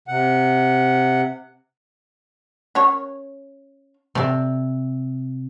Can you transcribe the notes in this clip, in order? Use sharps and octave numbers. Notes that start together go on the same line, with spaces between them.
C3 F#5
C#4 A#4 C#5
C3 A4 D5